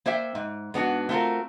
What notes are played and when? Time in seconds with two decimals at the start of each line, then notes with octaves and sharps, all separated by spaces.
0.06 A#3 C5 D5 E5 G5
0.35 G#2
0.74 G#2 B3 D4 F#4
1.09 A3 C4 F4 F#4 A#4